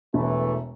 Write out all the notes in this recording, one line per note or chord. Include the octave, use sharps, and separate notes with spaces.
E1 E3 A3